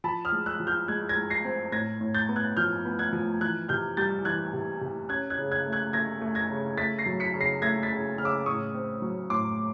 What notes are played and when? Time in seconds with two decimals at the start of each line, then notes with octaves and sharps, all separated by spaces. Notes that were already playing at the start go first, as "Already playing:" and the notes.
0.04 F3 A5 B5
0.25 D#6 F6
0.32 G#3
0.46 E6 F#6
0.60 F3
0.67 F6 G6
0.88 G#3 F#6 G#6
1.09 G#6 A#6
1.16 G#3
1.30 A#6 C7
1.44 C4
1.72 A2 G#6 A#6
2.01 A2
2.14 G6 A6
2.29 B3
2.36 F#6 G#6
2.57 F3 F6 G6
2.85 B3
2.99 F#6 G#6
3.13 F3
3.41 E3 F#6 G#6
3.68 C3 F6 G6
3.97 G3 G6 A6
4.25 E3 F#6 G#6
4.53 C3
4.81 C3
5.09 C#4 F#6 G#6
5.30 F#6 G#6
5.38 C#3
5.51 F#6 G#6
5.66 A3
5.72 F#6 G#6
5.93 A3 G#6 A#6
6.21 A3
6.35 G#6 A#6
6.49 C#3
6.78 A3 A6 B6
6.99 A#6 C7
7.06 F#3
7.20 B6 C#7
7.34 C#3
7.41 A#6 C7
7.62 A3 G#6 A#6
7.83 A6 B6
7.91 C#3
8.18 C#3 F6
8.25 D6 E6
8.46 A2 C#6 D#6
8.74 C4
9.02 F#3
9.30 A2 C6 D6